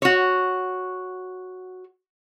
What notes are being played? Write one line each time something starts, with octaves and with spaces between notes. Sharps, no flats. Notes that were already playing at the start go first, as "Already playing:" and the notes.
F#4 C#5